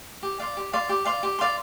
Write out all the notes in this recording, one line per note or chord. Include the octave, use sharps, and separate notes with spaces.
G4
D5 F5 C6
G4
D5 F5 C6
G4
D5 F5 C6
G4
D5 F5 C6